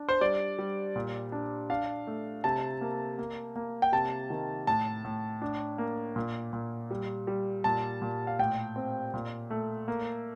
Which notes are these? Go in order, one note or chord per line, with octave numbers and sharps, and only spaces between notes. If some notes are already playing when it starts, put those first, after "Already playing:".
Already playing: D4
C5
G3 D5
G3
A#2
D4
D4 F5
A3
C3 A5
A#3
A#3
A#3
G5
C3 A5
D#3
A2 A5
A2
D4
A#3
A#2
A#2
G3
G3
A#2 A5
A#2
F5
A2 G5
C4
A#2
A3
A#3